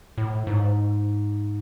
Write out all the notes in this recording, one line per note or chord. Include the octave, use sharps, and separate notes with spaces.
A2
G#2